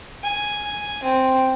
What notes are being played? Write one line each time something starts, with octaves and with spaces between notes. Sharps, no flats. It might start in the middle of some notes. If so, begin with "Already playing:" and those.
G#5
C4